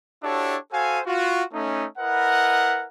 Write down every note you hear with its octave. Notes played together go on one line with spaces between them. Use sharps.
D4 E4 F#4 G4 A4 C#5
F#4 A4 C5 F5 G#5
F4 F#4
A3 C#4 D#4
E4 A#4 B4 D#5 F#5